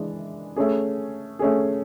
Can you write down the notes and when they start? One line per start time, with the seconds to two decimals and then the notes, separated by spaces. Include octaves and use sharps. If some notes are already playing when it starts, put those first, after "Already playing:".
Already playing: E3 G#3 D4
0.56 A3 C#4 G#4
1.39 A3 C#4 G#4